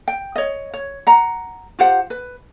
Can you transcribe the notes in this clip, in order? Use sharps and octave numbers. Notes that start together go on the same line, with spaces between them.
G5
C#5 D#5
C#5
F#5 A#5
F4 G4 C5 F#5
B4